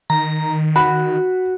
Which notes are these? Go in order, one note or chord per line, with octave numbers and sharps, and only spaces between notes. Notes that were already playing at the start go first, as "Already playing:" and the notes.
D#3 A#5
F#4 B5